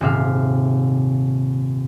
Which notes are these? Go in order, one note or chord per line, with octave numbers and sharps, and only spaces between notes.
D#1 G#2 C3 E5 F5